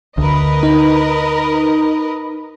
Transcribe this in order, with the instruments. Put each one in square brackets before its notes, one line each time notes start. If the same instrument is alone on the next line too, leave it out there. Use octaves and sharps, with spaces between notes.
[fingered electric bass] D2 [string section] A#4 B4 D#5
[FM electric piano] D#4